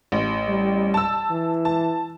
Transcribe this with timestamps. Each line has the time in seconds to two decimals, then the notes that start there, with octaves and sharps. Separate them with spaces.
0.12 A1
0.48 G3
0.94 A5 E6
1.30 E3
1.65 A5